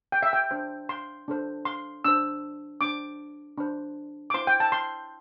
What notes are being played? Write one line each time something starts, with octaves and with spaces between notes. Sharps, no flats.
G5
E5
G5
D4 C5
C6
D4 A4 C5
C6
D4 C5 E6
D4 C5 D6
D4 C5
D6
E4 C5 C6
G5
A5
C6